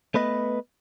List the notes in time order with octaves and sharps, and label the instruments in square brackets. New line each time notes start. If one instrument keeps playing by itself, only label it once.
[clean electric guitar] A3 B3 B4 D#5